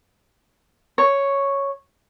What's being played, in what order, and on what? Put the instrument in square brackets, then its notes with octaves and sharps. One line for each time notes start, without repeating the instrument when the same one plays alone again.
[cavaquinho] C#5